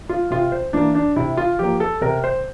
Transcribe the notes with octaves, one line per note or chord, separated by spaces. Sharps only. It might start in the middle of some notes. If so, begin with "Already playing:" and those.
F4
C3 F4
C5
E3 A#3 D4
D4
C3 E4
F4
F3 A#3 G4
A4
C3 A#4
C5